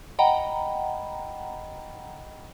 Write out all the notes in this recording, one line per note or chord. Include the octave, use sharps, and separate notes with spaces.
D#5 F#5 G5 A#5 B5